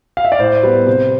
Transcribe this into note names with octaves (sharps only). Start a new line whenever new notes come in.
F5
E5
D5
A2 C5
G3 B3 B4
C3 C5